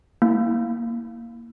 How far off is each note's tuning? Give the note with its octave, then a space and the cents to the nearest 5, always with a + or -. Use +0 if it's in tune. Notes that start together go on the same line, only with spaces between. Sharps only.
A#3 +0 E4 -25